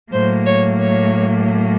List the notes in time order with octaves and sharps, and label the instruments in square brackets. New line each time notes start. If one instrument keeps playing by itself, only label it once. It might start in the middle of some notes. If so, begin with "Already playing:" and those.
[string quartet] A2 F#3 A#3 C5
C#5
C#5